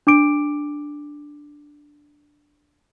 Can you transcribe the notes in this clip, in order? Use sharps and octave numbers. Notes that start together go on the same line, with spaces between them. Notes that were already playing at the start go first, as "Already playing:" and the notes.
D4 D6 D7